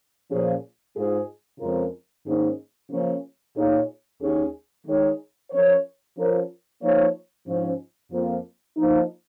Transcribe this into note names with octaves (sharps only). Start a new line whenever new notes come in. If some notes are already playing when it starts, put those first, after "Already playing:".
A#2 F3 C#4 G#4
G#2 G#3 F4 G#4
F2 C#3 G#3 F4 A#4
G#2 D#3 A#3 C#4 G#4
C#3 F3 A#3 C#4
A#2 A#3 D#4 G#4 C#5
D#2 D#3 C#4 G#4
D#3 G#3 D#4 G#4 C#5
F3 C#4 A#4 C#5
F3 C#4 F4 A#4 C#5
F3 A#3 D#4 C#5
G#2 F3 C#4
F2 F3 A#3 F4
F3 A#3 D#4